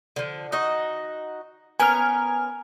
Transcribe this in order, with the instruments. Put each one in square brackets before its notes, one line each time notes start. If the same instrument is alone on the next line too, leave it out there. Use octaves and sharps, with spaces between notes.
[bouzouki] D3 F3
D#4 F#4 D#5
[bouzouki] B3 C#4 A#4 [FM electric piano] G#5 F6